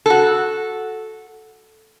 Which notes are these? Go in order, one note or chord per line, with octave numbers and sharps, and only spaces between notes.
F#4 A4